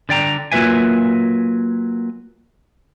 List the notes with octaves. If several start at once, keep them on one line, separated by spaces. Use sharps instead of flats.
D3 D5 G5 A#5
F#3 A#3 F4 B4 E5 G#5